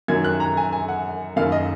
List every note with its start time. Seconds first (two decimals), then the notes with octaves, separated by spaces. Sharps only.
0.08 F#2 D#3 F#3 G#6
0.24 F#6
0.40 A#5
0.57 G#5
0.73 G#5
0.88 F#5
1.36 F#1 F#2 D#3 F5
1.52 D#5